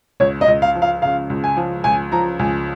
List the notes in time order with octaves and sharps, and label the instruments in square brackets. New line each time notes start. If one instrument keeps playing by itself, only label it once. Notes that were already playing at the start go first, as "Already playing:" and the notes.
[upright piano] C#2 [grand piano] C#5
[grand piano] D#5
[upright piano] C#2
[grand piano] F5
[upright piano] F3
[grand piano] F5
[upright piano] C#3 [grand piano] F5
[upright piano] C#2
[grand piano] G#5
[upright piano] F3
[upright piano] C#2 [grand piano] G#5
[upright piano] F3 [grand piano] A#5
[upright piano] C#2 [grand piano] G#5